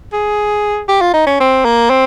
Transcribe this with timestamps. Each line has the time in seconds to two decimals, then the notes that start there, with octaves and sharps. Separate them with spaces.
0.13 G#4
0.89 G4
1.01 F4
1.14 D#4
1.26 C#4
1.40 C4
1.65 A#3
1.90 C4